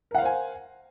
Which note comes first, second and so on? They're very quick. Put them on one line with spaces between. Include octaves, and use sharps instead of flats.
A#4 F#5 F5 C5 G#5